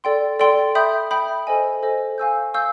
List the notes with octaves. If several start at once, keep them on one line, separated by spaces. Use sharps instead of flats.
A4 D5 G5 C6
A4 D5 G5 C6
E5 G5 B5 D#6 G6
E5 G5 B5 D#6 G6
A4 C5 D#5 G#5
A4 C5 D#5 G#5
F5 G#5 C#6 E6 G6
F5 G#5 C#6 E6 G6